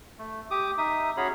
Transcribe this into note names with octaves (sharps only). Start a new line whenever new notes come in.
A3
G4 D6 D#6
D#4 E5 D#6
C#4 F#4 G#4 C#5 B5